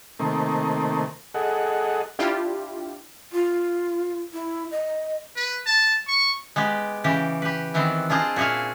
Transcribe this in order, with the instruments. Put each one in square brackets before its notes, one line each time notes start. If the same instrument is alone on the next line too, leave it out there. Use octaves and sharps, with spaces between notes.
[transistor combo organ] C3 D#3 A3 A#3
G#4 A4 D#5 F#5
[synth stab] D4 E4 F4 G4
[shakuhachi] F4
E4
D#5
[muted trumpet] B4
A5
C#6
[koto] G#3 B3 G4
C#3 E3 G4
G4 B4
D#3 E3 B3 C4
D4 F4 G#4 C5 D#5
A#2 F#4 G#4 E5 F5